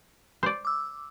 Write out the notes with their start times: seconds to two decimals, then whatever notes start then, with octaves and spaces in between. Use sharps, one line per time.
0.43 C5 D5
0.65 D6 E6